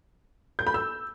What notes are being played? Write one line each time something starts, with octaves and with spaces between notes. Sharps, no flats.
G6
B5
E6